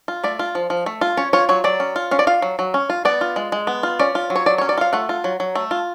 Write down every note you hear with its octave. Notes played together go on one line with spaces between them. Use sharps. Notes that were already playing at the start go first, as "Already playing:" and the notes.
F4
A3 D5
F4
F3
F3
A3
F4
C#4 C#5
F4 C#5
F#3 C#5
F#3 D5
C#4
F4
C#4 F5
D5
F4 F5
F#3
F#3
C#4
F4
B3 D5
F4
G#3
G#3
B3
F4
C#4 D5
F4
F#3
C#5
F#3 D5
C#4 C#5
D5
F4 F5
A3 F#5
F4
F#3
F#3
A3
F4